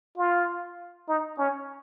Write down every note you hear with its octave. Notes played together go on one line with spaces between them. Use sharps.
F4
D#4
C#4